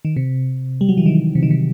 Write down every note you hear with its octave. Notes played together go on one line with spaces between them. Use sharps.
D#3
C3
G3
F#3
E3
D#3
C3
D#3
C3